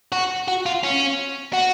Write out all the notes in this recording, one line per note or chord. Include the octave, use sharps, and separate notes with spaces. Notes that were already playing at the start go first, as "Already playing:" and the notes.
F#4
F#4
F4
C#4
F#4